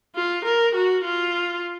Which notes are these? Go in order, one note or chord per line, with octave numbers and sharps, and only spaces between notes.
F4
A#4
F#4
F4